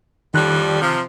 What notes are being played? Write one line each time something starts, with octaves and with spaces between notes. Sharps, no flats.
F2 A2 D#3 G3 F#6
C3 F3